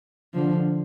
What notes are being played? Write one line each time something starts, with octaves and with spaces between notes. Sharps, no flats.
D3 F3